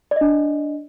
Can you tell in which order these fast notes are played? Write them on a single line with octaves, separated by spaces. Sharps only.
D5 D#5 D4